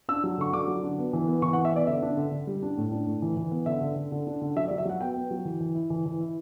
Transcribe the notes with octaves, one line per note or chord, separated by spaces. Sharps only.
D4 E6
F#3
D3 C#6
D3 D6
F#3
D4
B3
E3
B3
E3 C#6
F#5
B3
E5
B3 D5
D3 E5
D4
D3
D3
G3
D4
A2
D4
A2
E3
E3
B3
D3 E5
D3
D3
D3
D4
D3
F#3 E5
D5
F#3
E5
F#3 F#5
B3 G5
B3
F#3
E3
E3
E4
E3
E3
E4